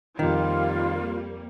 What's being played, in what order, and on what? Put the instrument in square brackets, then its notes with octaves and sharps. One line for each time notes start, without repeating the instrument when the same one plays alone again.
[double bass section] F2 [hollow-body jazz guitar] D#3 [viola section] G3 A#3 [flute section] F4